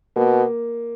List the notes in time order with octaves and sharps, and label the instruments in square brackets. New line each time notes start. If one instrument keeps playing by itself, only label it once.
[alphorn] B2 [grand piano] A#3